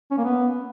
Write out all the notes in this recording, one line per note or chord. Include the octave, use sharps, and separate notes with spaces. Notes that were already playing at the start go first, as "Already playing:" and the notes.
C#4
A#3
B3